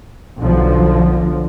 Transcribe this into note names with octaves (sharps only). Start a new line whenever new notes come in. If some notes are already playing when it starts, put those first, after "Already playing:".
B1 D3 F3